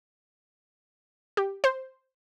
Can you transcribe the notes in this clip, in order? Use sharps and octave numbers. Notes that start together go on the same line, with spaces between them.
G4
C5